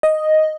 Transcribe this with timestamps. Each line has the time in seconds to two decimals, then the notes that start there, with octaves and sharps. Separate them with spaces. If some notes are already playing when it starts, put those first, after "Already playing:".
0.03 D#5